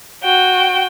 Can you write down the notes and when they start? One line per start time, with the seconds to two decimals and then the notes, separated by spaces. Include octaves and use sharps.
0.24 F#4 G5